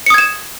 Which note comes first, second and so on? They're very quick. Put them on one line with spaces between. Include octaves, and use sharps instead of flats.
C#7 D#6 G#6 E7